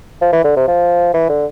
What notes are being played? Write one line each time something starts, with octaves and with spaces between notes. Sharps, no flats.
F3
E3
D3
C3
F3
E3
D3